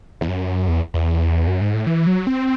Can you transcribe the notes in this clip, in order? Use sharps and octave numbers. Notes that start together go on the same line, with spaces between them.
E2
F#2
E2
E2
F#2
G#2
A2
E3
F#3
C4